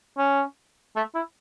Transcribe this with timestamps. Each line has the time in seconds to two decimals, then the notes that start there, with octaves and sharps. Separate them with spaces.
0.18 C#4
0.96 A3
1.15 E4